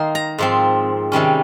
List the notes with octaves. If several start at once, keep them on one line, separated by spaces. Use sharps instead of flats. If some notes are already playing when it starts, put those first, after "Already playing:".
Already playing: D#3 A#3 D#4 C6
A#5
G#2 F3 C4
C3 D#3 G3 C#4